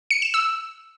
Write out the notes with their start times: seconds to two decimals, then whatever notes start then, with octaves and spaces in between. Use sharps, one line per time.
0.11 C#7
0.22 E7
0.34 E6